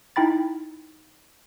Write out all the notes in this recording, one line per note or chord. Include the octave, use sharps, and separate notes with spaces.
D#4 E4 G5 B5 A6